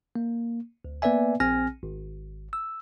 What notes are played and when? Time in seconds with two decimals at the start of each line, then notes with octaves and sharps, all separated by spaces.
0.15 A#3
0.85 D2
1.02 A#3 B3 B4 D5 E5 G#5
1.40 A#1 C4 G#5 F6 A#6
1.83 G#1
2.53 E6